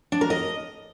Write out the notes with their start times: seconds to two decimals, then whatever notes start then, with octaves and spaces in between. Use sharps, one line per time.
0.12 D4
0.21 A#4
0.30 D#5